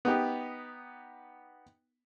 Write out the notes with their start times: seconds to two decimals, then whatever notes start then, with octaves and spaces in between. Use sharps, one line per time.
0.05 B3 D#4 G4